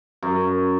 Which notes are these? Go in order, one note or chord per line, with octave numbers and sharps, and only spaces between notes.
F#2